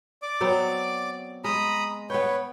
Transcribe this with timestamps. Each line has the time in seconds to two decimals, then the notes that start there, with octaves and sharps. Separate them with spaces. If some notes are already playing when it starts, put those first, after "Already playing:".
0.22 D5 D6
0.41 F#3 B3 C4
1.44 G#3 A#5 B5 D#6
2.10 B3 B4 C#5 G5